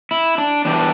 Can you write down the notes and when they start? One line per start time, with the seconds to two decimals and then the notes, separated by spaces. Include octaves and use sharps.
0.11 E4
0.38 D4
0.65 E2 E3 G3 D4